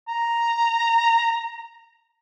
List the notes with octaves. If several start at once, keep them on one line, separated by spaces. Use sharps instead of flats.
A#5